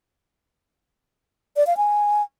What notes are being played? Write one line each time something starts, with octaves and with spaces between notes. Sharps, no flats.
D5
F5
G#5